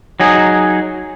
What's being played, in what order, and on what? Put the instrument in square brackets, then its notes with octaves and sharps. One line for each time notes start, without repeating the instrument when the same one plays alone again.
[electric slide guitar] F#3 D#4 G#4